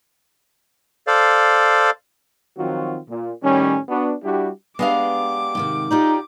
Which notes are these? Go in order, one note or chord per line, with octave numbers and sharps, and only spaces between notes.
A4 C5 D5 F5
D#3 F3 F#3 C4 F4 F#4
A#2
A2 D#3 G3 C#4
B3 D4 F#4
G3 D4 E4 F#4 G4
G#3 B3 D4 G4 F5 D6
G#2 C3 D#3
D#4 F4 G4 D5